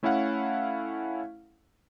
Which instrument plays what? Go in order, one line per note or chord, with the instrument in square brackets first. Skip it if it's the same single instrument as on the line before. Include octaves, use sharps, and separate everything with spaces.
[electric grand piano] A3 C#4 E4 A4 F5 F#5